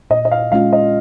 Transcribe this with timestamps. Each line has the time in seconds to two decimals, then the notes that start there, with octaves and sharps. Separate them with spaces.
0.10 A#2 D#5
0.25 D#5
0.32 F5
0.52 G#3 C#4 F4 F5
0.73 D#5